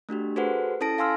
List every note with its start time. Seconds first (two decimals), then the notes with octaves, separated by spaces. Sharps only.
0.09 A3 D4 F#4 G4
0.36 F#4 G#4 A4 B4 C5 F#5
0.81 C#4 E4 A4 A5 A#6 D7
0.98 F5 G#5 C6 E6 F6